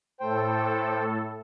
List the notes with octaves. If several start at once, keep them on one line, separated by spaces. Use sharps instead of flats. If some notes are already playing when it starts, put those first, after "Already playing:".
A2 A4 C5 G5